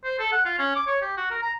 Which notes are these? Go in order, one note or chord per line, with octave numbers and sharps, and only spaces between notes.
C5
A4
F#5
F4
C#4
D6
C#5
G4
F#4
A#4
A#5